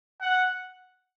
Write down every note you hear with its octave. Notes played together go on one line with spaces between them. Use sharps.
F#5